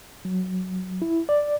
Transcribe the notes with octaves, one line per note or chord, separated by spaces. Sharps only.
F#3
E4
D5